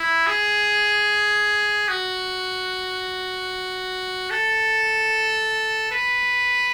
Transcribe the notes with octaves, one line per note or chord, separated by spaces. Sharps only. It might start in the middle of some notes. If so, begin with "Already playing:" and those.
Already playing: E4
G#4
F#4
A4
B4